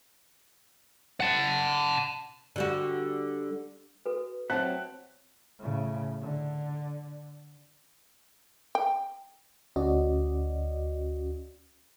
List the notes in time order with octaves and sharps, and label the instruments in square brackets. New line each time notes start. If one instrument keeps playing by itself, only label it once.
[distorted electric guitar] F#5 A5
[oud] D3 G3 F#4
[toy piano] F#4 A4 B4
[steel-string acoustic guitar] F#3 C4 [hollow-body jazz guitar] E5 F#5 A5 [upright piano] F#6
[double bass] A2 C#3
D3
[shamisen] G5
[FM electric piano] D2 C#4 F#4 D5 D#5